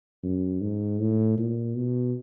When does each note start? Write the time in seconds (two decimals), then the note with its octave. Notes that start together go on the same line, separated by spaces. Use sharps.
0.23 F#2
0.61 G#2
1.00 A2
1.38 A#2
1.75 B2